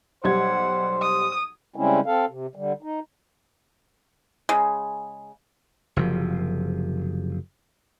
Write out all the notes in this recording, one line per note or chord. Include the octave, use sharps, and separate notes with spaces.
B1 G3 C5 F#5 G#6
D#6
C#3 G3 G#3 C4 C#4 E4
C4 A4 F5
C3
D3 G3
D#4
C#3 G#3
F#1 C3 F3